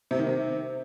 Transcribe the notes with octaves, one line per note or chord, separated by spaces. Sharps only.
C3
D#3
C3